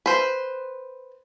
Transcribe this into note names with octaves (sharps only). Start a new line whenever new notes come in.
B4 C5